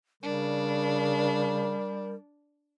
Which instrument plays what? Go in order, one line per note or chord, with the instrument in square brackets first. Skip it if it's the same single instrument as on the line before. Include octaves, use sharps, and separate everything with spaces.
[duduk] C#3 [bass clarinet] G3 [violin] D4 [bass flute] A#4